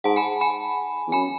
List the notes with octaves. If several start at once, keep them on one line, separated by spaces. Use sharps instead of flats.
G#2 F#5 A5
G#5 B5
G#5 B5
E2
F#2 G#5 B5